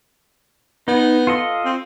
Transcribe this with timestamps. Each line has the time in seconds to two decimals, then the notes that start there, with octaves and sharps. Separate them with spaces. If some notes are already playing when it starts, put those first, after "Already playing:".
0.88 B3 D#4
1.27 F4 A4 D#5
1.65 C4